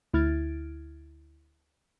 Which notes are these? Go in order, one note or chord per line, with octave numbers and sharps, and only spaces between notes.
D2 E4 F6 G#6 A6 D7